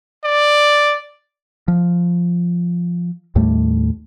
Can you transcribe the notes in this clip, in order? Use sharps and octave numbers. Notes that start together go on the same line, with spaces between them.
D5
F3
D#2 A2 G3 A3